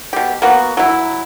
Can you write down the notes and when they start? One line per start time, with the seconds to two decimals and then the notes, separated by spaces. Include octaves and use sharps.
0.13 B2 G4
0.42 A#3 B3 F#4
0.77 F#3 E4